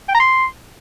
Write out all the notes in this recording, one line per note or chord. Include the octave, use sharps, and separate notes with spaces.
G5
A#5
C6